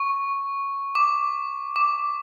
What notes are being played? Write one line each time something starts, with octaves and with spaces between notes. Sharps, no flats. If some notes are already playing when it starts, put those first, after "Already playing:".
Already playing: C#6
D6
D6